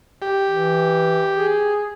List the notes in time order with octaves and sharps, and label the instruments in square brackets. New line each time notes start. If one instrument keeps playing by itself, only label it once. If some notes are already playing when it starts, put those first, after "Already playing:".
[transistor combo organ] G4
[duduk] E3
G#4